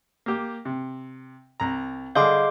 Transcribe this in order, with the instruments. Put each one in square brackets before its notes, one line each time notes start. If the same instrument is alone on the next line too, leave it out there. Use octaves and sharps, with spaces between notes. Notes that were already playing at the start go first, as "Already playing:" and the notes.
[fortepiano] A#3 G4
C3
C2 A#5
[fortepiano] D3 G3 [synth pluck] G#4 D#5 G6 [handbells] F5 C6 D6